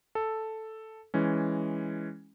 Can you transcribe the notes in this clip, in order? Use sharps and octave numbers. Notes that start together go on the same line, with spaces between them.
A4
E3 G#3 C#4